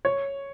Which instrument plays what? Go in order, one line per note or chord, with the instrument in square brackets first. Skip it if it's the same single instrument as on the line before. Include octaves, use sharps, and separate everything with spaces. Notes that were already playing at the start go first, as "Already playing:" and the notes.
[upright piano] C#5